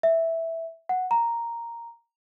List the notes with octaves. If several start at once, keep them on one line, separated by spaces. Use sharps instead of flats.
E5
F#5
A#5